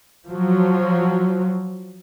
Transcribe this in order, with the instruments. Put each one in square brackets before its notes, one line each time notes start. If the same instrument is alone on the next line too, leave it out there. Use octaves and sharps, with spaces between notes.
[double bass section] F3 F#3